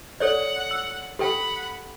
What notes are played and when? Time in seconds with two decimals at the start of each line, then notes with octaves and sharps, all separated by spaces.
0.20 A4 C#5 D5 F#5
0.71 E6
1.19 G4 A4 F#5 G5 B5